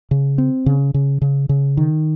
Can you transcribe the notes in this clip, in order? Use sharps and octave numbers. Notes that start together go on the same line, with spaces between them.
C#3
C4
C#3
C#3
C#3
C#3
D#3